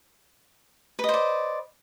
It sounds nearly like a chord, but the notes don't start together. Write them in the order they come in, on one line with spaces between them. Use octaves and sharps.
B4 D#5 C5 D5